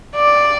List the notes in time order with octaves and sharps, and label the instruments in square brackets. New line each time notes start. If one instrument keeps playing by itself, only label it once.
[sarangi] D5